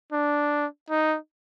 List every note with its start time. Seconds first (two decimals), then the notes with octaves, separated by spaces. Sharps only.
0.12 D4
0.90 D#4